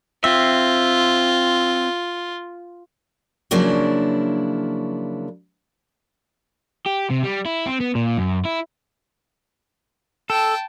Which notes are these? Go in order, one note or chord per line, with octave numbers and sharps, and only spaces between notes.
C4 F4 E5
C#3 F3 F#3 A#3 D4 E4
G4
C3
G3
E4
C4
B3
A#2
F#2
E4
A4 G5 A5